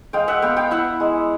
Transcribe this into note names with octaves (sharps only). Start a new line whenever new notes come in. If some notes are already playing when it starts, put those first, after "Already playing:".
G#3 F5 G5
E5 F#5
B3 F5 G5
F5 G5
E4 E5 F#5
G#3